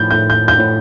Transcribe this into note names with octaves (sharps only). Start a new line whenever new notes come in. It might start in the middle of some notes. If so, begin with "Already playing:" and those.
Already playing: A2 F3 G6
A2 G6
G6
G6
A2